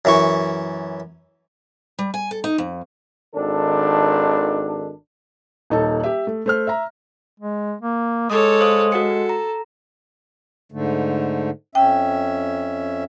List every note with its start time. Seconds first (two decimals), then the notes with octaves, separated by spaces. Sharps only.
0.05 F#2 E3 C#6
1.99 G3
2.14 G#5
2.31 A4
2.44 D#4
2.58 F2
3.34 G#1 D#3 D4 A4
5.70 D#1 D#4 A4 A5
6.03 G4 E5
6.27 A3
6.46 A3 C5 F6
6.67 E5 A#5
7.40 G#3
7.81 A#3
8.30 G#3 A4 C#5 D6 D#6
8.61 C5 F5 D#6
8.92 F#4 A4 F#5 C#7
9.29 A#5
10.72 G#2 D3 A3
11.75 F2 C#4 E5 G5